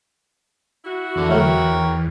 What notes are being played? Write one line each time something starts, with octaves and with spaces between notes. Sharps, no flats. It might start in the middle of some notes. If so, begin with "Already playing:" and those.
E4 F#4
E2 D3
D3 F#3 A3 A#4 C#5 G5